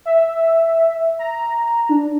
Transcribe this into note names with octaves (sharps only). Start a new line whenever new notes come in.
E5
A#5
D4